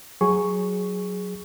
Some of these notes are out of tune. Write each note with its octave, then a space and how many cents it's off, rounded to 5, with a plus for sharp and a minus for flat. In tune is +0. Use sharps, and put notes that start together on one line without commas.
F#3 +0 G#4 +0 C#6 +0